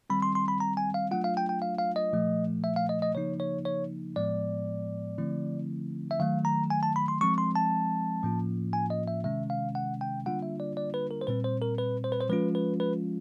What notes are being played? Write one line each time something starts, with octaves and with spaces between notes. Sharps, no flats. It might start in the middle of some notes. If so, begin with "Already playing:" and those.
D#3 G3 C4 B5
C6
C6
B5
A#5
G#5
F5
F#3 A3 D4 F4 F#5
F5
G5
G5
F5
F5
D#5
A#2 F3 A3
E5
F5
D#5
D#5
C#3 F3 A#3 D#4 C#5
C#5
C#5
A2 F3 G#3 B3 D5
D3 F3 A3 C4 E4
E5
D#3 F#3 A3 F5
A#5
G#5
A5
B5
C6
F3 G#3 C4 C#6
C6
A5
A2 F3 A#3 C#4 F4
G#5
D#5
E5
C3 D#3 G#3 C#4 E5
F5
F#5
G5
D3 G3 A#3 D4 F4 F#5
E5
D5
D5
B4
A#4
C5
A#2 G3 C4 B4
C5
A#4
B4
C5
B4
C5
F3 G#3 C#4 F4 B4
B4
B4